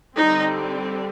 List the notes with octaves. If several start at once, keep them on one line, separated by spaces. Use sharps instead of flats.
D3 G3 C4 D#4